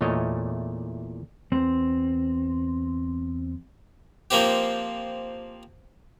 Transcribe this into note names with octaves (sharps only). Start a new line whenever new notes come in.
E2 A#2 A3 C#5 D#5
E2 C4
F3 A#3 C4 G4